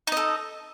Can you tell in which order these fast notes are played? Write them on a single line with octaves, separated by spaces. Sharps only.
D#4 D#5 A4